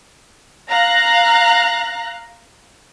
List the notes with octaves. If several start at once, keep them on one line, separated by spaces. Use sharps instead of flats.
F5 A#5 F#6 A#6